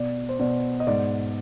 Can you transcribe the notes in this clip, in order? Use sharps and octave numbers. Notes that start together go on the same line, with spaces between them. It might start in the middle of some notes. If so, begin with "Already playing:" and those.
Already playing: B2 D5
C5
B2 D5
D#5
G#2 D5